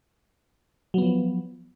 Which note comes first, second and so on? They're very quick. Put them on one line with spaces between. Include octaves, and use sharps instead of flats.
F#3 B3 F3